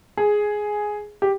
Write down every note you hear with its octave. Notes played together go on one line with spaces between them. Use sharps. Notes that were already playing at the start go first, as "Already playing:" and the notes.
G#4
G4